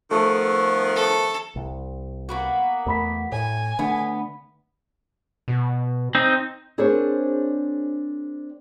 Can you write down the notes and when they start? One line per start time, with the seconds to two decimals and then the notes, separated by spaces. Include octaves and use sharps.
0.11 D#3 F3 A3 B3
0.96 A4
1.56 C2
2.29 A#3 B3 F#4
2.86 E2 A3 A#4 B5 B6
3.32 A2 C#5 G#5
3.79 D3 A3 B3 D4
5.48 B2
6.15 C4 D#4
6.78 C4 D4 G#4 A#4 C5 C#5